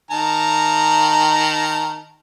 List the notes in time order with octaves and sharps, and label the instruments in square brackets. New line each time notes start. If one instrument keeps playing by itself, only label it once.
[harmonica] D#3 A5 A#5